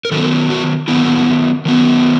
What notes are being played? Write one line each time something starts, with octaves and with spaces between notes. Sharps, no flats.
A#4
D#3 F#3 B3 A4
F#4
D#3 F#3 B3 E4
D#3 F#3 B3